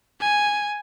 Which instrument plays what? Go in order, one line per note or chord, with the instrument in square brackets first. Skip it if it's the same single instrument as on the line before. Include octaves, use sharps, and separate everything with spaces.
[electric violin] G#5